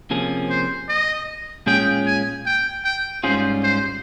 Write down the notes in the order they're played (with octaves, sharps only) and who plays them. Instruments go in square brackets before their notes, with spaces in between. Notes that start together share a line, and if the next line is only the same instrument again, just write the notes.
[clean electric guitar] C3 F3 A#3 C#4 G#4
[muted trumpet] C5
D#5
[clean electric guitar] A#2 G#3 C#4 F4 G#4 [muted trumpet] G5
[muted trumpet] G#5
G5
G5
[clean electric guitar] G#2 G3 C#4 F4 G#4 [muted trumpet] C5
[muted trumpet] C5